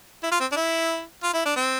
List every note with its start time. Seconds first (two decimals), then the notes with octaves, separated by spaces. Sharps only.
0.23 E4
0.31 F4
0.40 C4
0.52 D4
0.56 E4
1.23 F4
1.34 E4
1.45 D4
1.56 C4